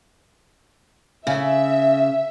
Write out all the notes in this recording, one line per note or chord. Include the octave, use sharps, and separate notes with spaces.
C#3 E5